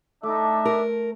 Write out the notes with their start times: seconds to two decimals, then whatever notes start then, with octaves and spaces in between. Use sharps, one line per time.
0.23 A3 D4 D#4 A4 E5 D6
0.65 A#4